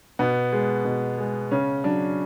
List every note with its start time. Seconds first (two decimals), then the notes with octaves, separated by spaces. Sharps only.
0.19 B2 B3
0.52 G#3
0.85 B2
1.18 G#3
1.51 C#3 C#4
1.84 F#3 D4